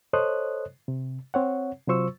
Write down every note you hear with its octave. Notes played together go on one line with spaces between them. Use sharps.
A4 C5 C#5 D#5 D#6 F#6
C3
C4 C#5 F#5
C3 F#3 F4 C5 C#6 E6